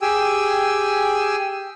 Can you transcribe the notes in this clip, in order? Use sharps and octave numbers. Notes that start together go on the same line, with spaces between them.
G4 G#4 G5 G#5 E6